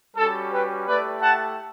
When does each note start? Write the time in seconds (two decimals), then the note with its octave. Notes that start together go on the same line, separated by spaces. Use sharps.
0.17 G3 C#4 F#4 A4
0.53 G4 B4
0.87 A3 E4 G4 B4 D5
1.22 F#5 A5